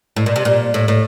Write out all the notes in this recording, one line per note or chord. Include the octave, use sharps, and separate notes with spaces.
A2
A#2
C3
A#2
A2
A2